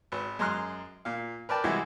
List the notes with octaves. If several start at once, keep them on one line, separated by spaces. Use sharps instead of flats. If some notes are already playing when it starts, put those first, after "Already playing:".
G#1 B4
F#2 G#3 A#5 C6 F6 F#6
A#2 F5
A#4 B4 D5 G5 A5
C3 E3 G3 G#3 E4 F#4